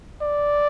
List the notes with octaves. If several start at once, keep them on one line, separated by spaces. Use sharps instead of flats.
D5